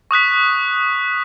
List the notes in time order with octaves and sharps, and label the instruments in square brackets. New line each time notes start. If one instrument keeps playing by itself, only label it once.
[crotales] C#6 D#6 F#6 B6